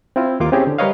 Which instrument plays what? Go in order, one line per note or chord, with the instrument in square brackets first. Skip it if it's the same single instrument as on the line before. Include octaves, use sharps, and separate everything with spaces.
[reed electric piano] C4 E4 F4
D#2 A#3 F4 D6
C4 C#4 E4 G4 G#4
D3
G3 A#4 B4 C#5 D#5 F5